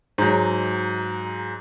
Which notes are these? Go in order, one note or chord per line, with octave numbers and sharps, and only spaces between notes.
G#2 F#3